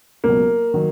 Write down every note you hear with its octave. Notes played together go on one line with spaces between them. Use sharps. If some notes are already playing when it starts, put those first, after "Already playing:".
C#2 B2 F#3 A#3
D#3 F#3